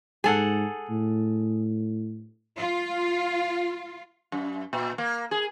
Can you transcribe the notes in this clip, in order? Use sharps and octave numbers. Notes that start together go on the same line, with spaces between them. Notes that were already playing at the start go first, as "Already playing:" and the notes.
G#2 G#4 A4 F#5
A2
F4
F#2
A#2
A#3
G#4